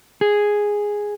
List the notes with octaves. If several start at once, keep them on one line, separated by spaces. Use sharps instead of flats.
G#4